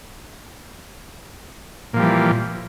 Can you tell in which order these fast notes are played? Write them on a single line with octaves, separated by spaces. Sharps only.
A#2 F3 G3 E3